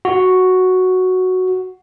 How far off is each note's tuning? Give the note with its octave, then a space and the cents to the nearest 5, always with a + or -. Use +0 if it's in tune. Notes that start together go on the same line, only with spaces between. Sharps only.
F#4 +0